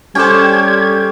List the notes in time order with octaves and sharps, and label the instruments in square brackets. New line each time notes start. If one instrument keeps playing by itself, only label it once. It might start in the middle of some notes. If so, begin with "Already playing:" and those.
[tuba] G3 [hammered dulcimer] C#4 G4 C5 [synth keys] A4 G5 [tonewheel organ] G#6